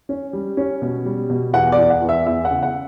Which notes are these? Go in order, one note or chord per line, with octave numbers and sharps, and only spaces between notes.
C#4
G3
C#4
B2
G3
B2
E2 F#5
D5
E2
F#5
E2
E5
E2 E5
F#5
C#3
F#5